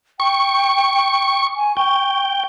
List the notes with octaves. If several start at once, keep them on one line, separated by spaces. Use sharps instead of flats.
G5 C#6
G#5
G5 C#6